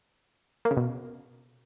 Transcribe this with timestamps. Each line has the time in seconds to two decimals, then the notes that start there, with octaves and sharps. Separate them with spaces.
0.65 A#3
0.71 C#3
0.77 B2